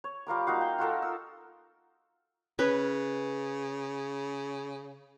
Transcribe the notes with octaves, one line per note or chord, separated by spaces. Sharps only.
C#5
G3 F4 A#4 D6
A#3 D#4 F#4 F5
G5
F4 F#4 A4 A#4
E6
C#3 C#4 B4